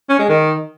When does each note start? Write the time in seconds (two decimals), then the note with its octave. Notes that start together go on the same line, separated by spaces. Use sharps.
0.09 C#4
0.19 G#3
0.29 D#3